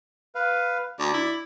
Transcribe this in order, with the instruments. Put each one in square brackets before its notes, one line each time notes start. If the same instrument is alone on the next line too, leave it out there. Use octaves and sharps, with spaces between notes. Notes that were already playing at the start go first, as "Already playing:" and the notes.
[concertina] B4 F5
[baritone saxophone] D2 [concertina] D5
[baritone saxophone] E4